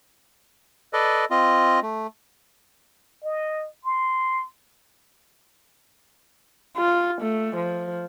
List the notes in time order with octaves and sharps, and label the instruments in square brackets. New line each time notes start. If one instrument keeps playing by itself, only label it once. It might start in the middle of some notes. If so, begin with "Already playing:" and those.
[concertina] A4 B4 D5 D#5
C4 F4 D#5
A3
[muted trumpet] D#5
C6
[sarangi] F4
A3
F3